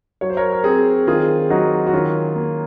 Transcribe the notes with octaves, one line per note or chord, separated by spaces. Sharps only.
F#3 C#5
C5
A#4 C#5
A#4
C4 G#4 C5
D#3 F4 G#4
F#3 D#4 F#4
F#4
D#3 C#4 F4
A#3